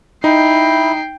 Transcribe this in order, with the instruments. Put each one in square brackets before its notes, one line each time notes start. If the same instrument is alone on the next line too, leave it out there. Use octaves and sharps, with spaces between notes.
[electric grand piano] D#4 [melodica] E4 [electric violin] G5 C7